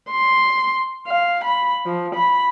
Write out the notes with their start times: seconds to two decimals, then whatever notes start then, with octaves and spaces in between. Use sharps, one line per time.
0.11 C6
1.08 F5
1.44 B5
1.86 F3
2.15 B5